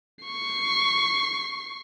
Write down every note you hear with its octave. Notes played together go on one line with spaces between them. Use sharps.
C#6 C7